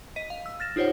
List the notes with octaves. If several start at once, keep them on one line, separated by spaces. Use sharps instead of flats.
D#5 B6 D#7
F5
E6
F6 A6 A#6 E7
D#4 F4 G4 C5 C#5 F#5